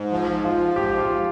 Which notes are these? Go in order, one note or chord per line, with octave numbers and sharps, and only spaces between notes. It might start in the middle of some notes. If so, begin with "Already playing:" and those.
Already playing: G#2
F3
F3 F4
G#2 G4
F4